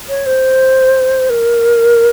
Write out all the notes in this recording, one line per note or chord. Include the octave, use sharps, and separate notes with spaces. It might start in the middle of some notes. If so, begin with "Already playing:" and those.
C#5
C5
A#4